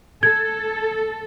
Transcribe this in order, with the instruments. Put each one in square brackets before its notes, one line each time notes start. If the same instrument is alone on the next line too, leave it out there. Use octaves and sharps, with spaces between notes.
[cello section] A4 [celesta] G#6